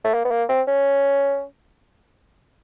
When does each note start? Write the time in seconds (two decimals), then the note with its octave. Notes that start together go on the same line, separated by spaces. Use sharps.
0.04 A3
0.14 A#3
0.25 B3
0.31 A#3
0.49 C4
0.67 C#4